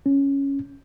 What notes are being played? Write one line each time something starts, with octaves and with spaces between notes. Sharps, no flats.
C#4